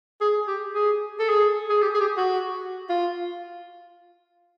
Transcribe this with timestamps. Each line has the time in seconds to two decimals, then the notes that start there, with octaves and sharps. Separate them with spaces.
0.21 G#4
0.47 G4
0.75 G#4
1.20 A4
1.29 G#4
1.70 G#4
1.82 G4
1.95 G#4
2.00 G4
2.17 F#4
2.90 F4